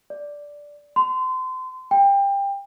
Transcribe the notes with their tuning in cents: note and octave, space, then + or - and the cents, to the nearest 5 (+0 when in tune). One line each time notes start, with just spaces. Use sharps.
D5 -5
C6 -30
G5 +25